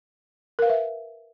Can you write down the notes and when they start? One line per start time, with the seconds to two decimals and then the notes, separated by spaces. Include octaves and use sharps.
0.59 A#4
0.62 F5
0.66 B4
0.70 E5